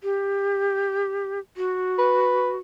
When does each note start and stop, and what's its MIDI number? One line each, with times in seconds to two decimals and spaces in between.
0.03 1.39 67
1.57 2.59 66
1.98 2.53 71